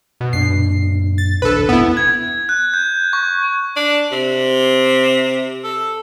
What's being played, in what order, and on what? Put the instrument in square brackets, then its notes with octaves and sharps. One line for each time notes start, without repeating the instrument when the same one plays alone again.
[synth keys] B2
[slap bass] F#2 A#2 D4 [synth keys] C7
[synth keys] A6
[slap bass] A#1 D#2 D4 [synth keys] A4 B4
[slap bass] E1 A1 G2 [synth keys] B3 E4
[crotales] G#6
F#6
G6
C#6
[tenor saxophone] D4
C3
A4